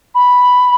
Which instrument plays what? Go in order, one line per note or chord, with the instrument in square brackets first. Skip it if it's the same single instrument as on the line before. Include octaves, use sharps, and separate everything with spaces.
[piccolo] B5